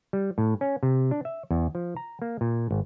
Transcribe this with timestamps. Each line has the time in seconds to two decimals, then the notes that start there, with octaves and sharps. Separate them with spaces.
0.13 G3
0.38 A2
0.61 C#4
0.83 C3
1.11 D4
1.25 E5
1.51 E2
1.75 F3
1.96 A#5
2.22 A#3
2.41 A#2
2.71 G#1